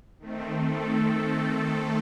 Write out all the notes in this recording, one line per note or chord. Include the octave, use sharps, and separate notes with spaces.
D#3 A3 C4
A4